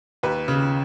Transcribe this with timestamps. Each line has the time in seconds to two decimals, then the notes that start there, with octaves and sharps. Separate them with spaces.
0.23 D#2 B4
0.48 C#3